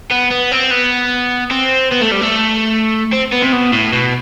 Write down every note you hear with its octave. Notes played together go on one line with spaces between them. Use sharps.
B3
B3
C4
B3
C4
B3
A3
G3
A3
C4
B3
C3
B2
A2
B2